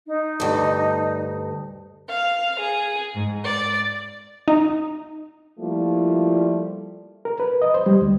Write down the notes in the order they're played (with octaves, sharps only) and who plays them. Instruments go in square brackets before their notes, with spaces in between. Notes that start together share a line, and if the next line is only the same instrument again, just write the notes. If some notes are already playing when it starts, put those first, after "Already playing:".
[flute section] D#4
[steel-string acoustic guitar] D2 G2
[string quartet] F5
G#4
G#2
D5
[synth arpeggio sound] D#4
[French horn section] F3 G3 A3 A#3 E4 F4
[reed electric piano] A#4
B4
D#5
C5
G3
D2